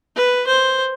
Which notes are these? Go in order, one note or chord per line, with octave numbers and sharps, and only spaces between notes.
B4
C5